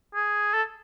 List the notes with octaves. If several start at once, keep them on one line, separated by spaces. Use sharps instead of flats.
G#4
A4